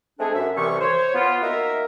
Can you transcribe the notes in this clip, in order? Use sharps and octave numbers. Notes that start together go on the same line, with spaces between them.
G#3 A3 C4 D4 G#4 A4
F#2 E5
C2 E3 C#6
C5 C#5
B3 F4
A#3 D#4 F#4 A#4 E5